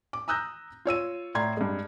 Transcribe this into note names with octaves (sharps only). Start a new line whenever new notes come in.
D6
A#5 D#6 E6 F#6 G6 A#6
F4 C#5 E6 D#7
A2 D5 A#5 C6 G#6
G2 G#3